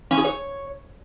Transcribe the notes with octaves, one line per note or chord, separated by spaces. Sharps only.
C#4
G#4
C#5